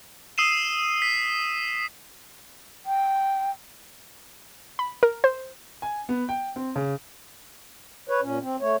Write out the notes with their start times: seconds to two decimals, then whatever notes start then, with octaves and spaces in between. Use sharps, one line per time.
0.38 D#6 E6 C7 D#7 E7
1.02 B6
2.86 G5
4.79 B5
5.03 A#4
5.24 C5
5.82 G#5
6.09 B3
6.29 G5
6.56 C4
6.76 C#3
8.09 B4 C#5
8.22 A#2 C#4
8.42 C4
8.61 A3 C#5